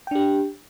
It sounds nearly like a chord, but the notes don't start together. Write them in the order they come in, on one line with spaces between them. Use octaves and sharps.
G5 D4 G4